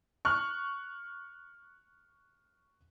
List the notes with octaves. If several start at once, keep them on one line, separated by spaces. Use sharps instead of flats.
C#6 F6 F#6